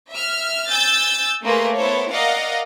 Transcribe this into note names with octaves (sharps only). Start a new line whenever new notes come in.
E5 F6
G#5 E6 G6 A6
A3 A#3 G#4 B4 C6
B3 E4 A4 C5 C#5
A#4 D5 D#5 F5 F#5 A#5